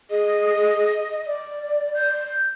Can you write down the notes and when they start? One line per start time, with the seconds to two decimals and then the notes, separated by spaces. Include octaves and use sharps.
0.10 G#4 D#5
1.27 D5
1.95 G6